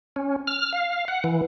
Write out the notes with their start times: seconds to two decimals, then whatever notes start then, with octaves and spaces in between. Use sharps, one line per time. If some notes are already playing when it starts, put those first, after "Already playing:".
0.16 C#4
0.47 F6
0.73 F5
1.08 F#5
1.24 E3